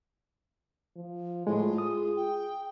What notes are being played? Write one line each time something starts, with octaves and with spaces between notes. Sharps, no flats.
F3
A2 G#3 F4
G#4 D#6
G5